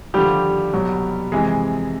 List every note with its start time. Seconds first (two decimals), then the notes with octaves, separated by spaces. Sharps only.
0.14 D#2 D3 F3 G3 G4
0.73 C2 B2 F#3
1.32 F2 C3 E3 G#3 G#4